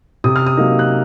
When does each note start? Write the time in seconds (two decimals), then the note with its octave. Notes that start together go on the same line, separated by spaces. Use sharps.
0.24 C3 D#6
0.36 F6
0.46 D#6
0.57 F#3 A#3 D#4
0.79 F#6